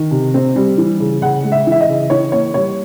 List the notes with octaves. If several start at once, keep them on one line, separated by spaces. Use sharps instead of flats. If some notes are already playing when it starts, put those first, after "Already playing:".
Already playing: D#3
C3
C4
G3
E3
C#3
C#3 F#5
G#3
E5
E3 E5
D#5
C#3
E3 C#5
A#3 C#5
G3 C#5